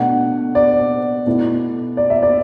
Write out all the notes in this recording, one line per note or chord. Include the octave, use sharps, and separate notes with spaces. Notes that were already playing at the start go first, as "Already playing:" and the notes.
Already playing: B2 A3 D4 F#5
D5
B2 A3 E4
D5
E5
D5